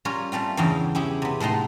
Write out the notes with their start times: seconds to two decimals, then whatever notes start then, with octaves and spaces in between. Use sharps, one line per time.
0.05 G3 C#4 F4 G4 A#4 C#5
0.32 G3 A3 C4 F4
0.57 E2 G2 C#3 E3 G5 A#5
0.95 C#4 E4 G4 G#4
1.22 C3 B3
1.40 A2 G#3 A3 D#4 C6